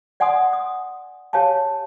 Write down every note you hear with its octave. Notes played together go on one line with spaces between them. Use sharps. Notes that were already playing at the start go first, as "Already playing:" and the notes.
D5 F#5 G#5 C6 D#6
D#6
G4 C#5 F5 G#5 A5